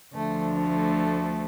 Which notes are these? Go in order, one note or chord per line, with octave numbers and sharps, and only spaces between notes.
D2 D3 F3 A3
A3